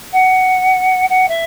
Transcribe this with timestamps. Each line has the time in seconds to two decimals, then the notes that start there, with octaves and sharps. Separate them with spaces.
0.13 F#5
1.10 F#5
1.28 E5